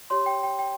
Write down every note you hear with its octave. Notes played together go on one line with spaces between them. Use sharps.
G4 C#5 C6
G5
G5
G5